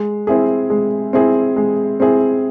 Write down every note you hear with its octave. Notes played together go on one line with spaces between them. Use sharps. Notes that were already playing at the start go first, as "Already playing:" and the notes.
Already playing: G#3
C4 E4 G#4
G#3
C4 E4 G#4
G#3
C4 E4 G#4